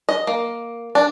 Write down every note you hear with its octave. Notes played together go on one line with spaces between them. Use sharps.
D#5
A#3
D4